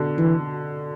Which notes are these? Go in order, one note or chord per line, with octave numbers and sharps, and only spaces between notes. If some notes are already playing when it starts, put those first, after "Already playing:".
Already playing: B2 D3
E3